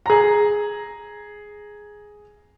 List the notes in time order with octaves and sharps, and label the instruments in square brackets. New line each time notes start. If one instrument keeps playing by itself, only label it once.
[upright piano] G#4 A#5